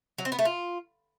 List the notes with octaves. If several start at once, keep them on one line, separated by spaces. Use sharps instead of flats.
F#3
C4
B3
A3
F4